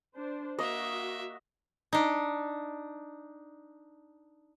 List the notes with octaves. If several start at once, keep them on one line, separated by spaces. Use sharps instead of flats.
D4 C5
A#3 F#4 D#5 E5
D4 D#4